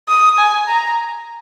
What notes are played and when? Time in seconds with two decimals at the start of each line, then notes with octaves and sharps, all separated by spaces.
0.08 D#6
0.38 G#5
0.68 A#5